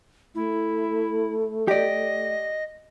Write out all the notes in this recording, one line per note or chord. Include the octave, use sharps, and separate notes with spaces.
A3 E4
G4 D5 D#5